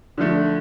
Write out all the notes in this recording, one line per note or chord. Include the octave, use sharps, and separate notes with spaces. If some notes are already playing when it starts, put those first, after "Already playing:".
D3 F3 A3